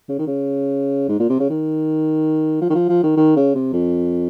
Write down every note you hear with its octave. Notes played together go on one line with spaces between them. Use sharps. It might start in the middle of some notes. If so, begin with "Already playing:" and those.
C#3
D#3
C#3
G#2
A#2
C3
C#3
D#3
F3
D#3
F3
F3
D#3
D#3
C#3
C3
F2